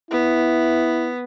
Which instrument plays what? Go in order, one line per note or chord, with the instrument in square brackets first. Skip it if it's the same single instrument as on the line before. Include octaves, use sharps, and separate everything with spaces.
[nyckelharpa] B3 [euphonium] E4